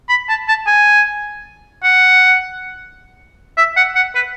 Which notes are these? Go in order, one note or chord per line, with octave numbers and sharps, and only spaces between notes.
B5
A5
A5
G#5
F#5
E5
F#5
F#5
B4